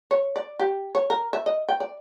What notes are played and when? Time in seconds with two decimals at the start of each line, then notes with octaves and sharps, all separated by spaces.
0.11 C#5
0.36 D5
0.59 G4
0.95 C#5
1.10 A#4
1.33 E5
1.46 D#5
1.69 G5
1.80 D5